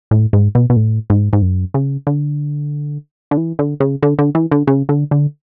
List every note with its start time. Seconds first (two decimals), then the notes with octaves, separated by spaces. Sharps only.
0.11 A2
0.33 G#2
0.55 B2
0.70 B2
0.76 A2
1.10 G#2
1.33 G#2
1.42 F#2
1.74 C#3
2.07 D3
3.31 D3
3.37 E3
3.59 D3
3.80 C#3
4.03 D3
4.19 D3
4.35 E3
4.51 D3
4.67 C#3
4.89 D3
5.11 D3